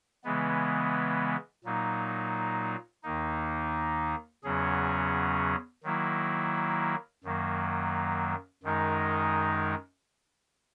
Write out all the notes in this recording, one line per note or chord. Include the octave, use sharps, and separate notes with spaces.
C#3 E3 G#3 B3
A#2 F#3 A#3 D#4
D#2 D#3 A#3 D#4
E2 C#3 F#3 C#4 G#4
D#3 F#3 A#3 E4
F#2 D#3 F#3 A#3
F#2 D#3 G#3 D#4 A#4